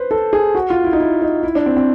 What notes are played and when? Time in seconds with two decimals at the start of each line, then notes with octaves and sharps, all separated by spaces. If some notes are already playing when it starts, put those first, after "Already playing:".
Already playing: B4 C5
0.11 A4
0.33 G#4
0.55 F#4
0.70 F4
0.84 E4
0.93 D#4
1.00 E4
1.22 D#4
1.43 E4
1.55 D4
1.66 C4
1.77 C4